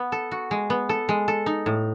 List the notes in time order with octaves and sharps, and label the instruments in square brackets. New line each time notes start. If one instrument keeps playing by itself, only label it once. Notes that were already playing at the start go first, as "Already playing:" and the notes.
Already playing: [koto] B3
A4
F#4
G#3
B3
A4
G#3
A4
D#4
A2